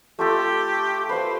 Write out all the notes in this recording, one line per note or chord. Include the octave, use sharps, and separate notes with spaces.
A3 F4 G4 A4
B4 C5 F5